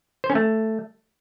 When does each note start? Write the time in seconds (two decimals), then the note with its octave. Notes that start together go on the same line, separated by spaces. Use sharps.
0.24 C5
0.30 C#4
0.35 A3